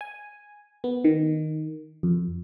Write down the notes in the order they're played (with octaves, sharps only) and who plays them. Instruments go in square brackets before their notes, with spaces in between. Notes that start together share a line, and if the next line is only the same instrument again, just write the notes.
[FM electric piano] G#5
B3
D#3
F2